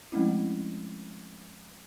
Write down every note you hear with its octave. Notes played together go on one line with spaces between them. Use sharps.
F3 G#3 A3 C4 C#4 E4